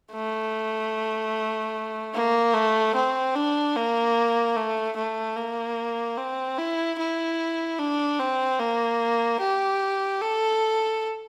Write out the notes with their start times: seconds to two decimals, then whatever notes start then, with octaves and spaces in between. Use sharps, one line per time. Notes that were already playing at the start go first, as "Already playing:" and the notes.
0.12 A3
2.14 A#3
2.54 A3
2.95 C4
3.35 D4
3.76 A#3
4.56 A3
4.96 A3
5.37 A#3
6.17 C4
6.58 E4
6.98 E4
7.78 D4
8.19 C4
8.59 A#3
9.40 G4
10.21 A4